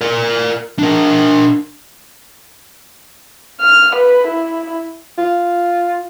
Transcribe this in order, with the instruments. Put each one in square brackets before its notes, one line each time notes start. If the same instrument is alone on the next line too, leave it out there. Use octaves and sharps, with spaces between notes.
[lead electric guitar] A#4 D5
D4 A#4
[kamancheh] F6
B4
E4
[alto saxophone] F4